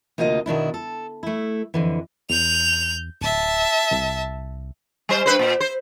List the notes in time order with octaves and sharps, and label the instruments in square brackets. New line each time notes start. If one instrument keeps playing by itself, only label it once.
[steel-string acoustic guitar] D2 C3 A#3 F4 D#5 F5
B2 D#3 D4 E4
A4
A3 E4
F2 D3 E3
[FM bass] E2 [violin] G6 F7
[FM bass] D1 [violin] E5 A5
[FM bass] C2
[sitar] G3 C5
G2 B4 C5
A#2
C5